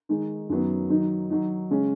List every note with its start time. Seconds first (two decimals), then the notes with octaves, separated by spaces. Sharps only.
0.09 D#3 G#3 D#4
0.49 F#2 D#3 F#3 B3
0.89 D#3 F#3 D#4
1.30 D#3 F#3 D#4
1.71 C#3 G#3 C#4